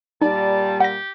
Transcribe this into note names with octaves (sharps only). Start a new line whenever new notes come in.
A#2 G3 D#4 D5 A5
G4 F#5 A#6